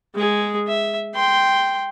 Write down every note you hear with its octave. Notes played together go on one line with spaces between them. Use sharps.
G#3 G#4
E5
G5 C6